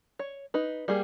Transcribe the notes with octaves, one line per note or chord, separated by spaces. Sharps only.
C#5
D#4 B4
G3 A#3 G#4 G5